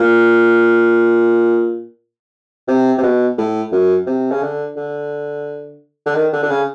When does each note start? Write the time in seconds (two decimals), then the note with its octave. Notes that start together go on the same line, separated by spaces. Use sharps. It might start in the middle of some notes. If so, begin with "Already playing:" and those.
Already playing: A#2
2.68 C3
2.98 C3
3.03 B2
3.38 A2
3.72 F#2
4.07 C3
4.31 C#3
4.42 D3
4.76 D3
6.06 D3
6.15 D#3
6.33 D3
6.43 D3
6.50 C#3